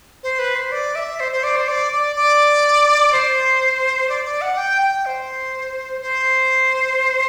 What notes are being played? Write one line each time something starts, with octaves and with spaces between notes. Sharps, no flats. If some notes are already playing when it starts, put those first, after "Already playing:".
C5
B4
C5
D5
E5
C5
C5
D5
C5
D5
D5
D5
C5
D5
D5
F#5
G5
G5
C5
C5